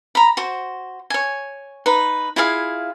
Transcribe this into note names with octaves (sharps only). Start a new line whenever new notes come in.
A#5 B5
F#4 C5
C#5 G#5
D#4 B4
E4 F4 G#4 F5